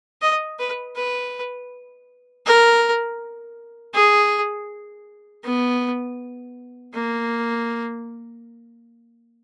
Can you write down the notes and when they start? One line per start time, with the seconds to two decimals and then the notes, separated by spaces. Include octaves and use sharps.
0.22 D#5
0.59 B4
0.96 B4
2.46 A#4
3.94 G#4
5.44 B3
6.93 A#3